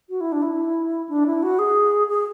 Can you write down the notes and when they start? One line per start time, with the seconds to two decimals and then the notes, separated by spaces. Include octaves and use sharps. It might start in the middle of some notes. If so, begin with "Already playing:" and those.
0.10 F#4
0.21 E4
0.32 D4
0.42 E4
1.09 D4
1.26 E4
1.43 F#4
1.59 G#4
2.08 G#4